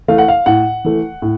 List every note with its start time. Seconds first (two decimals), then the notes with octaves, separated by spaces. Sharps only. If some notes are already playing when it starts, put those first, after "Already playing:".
0.08 E3 A3 F5
0.18 F#5
0.28 F5
0.46 A2 F#5
0.85 E3 A3
1.22 A2